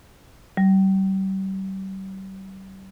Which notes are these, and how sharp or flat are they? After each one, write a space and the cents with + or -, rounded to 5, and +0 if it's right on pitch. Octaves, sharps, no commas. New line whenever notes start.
G3 -35